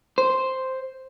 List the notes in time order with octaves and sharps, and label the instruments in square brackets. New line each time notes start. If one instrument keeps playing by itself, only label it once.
[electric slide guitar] C5